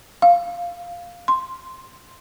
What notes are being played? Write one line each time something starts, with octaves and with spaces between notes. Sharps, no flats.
F5
C6